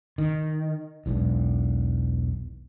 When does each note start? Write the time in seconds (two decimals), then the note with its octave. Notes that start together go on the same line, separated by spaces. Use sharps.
0.18 D#3
1.06 E1 B1 E2